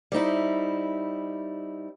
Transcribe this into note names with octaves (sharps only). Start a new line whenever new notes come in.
G3 C4 D#4 E4